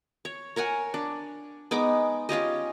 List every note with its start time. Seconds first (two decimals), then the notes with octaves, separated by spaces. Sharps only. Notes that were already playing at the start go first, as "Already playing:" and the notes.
0.25 C#5
0.56 A#4 C#5 F#5 G#5
0.94 D4
1.71 G#3 B3 D#4 D6
2.29 C#4 F4 G4 D#5